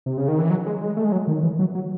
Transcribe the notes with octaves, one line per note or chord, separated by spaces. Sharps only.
C3
C#3
D#3
E3
F#3
G#3
G#3
A3
G#3
F#3
D#3
E3
F#3
F#3